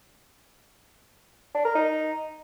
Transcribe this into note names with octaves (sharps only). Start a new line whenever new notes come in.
D4
A#4
D#4